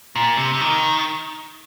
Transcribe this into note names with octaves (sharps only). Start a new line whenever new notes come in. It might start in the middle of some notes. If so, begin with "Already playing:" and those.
A#2
C3
C3
D#3